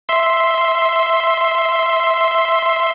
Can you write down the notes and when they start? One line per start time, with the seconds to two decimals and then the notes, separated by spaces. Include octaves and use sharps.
0.09 E5 C6